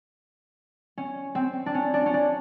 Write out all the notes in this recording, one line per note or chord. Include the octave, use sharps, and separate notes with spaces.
C#4
C4
D4
C#4
D4
C#4
D4